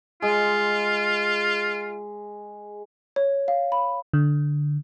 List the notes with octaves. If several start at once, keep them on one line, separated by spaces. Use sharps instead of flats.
G#3 F4
C#5
F5
B5
D3